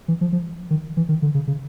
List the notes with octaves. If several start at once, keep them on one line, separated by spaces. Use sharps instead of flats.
E3
F3
F3
D#3
E3
D#3
D3
C#3
C#3